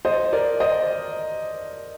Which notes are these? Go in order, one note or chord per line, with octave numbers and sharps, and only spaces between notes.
C5 D#5
A#4 D5
C5 D#5